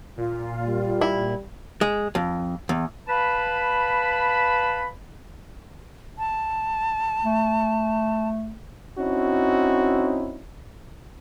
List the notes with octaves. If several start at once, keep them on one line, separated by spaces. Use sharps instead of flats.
A#2 F4
G3
E4
G#3
F2
E2
B4 F5 A5 B5
A5
A3
C4 C#4 D#4 E4 F#4